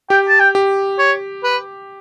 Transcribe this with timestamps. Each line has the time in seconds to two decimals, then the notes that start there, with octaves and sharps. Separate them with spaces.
0.10 G4 G5
0.28 A5
0.40 G5
0.55 G4
0.99 C#5
1.44 B4